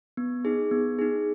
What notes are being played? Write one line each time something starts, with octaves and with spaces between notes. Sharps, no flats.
B3
D#4 G#4
B3
D#4 G#4